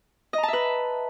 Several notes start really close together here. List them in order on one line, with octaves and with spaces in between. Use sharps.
D#5 A#5 A5 E5 B4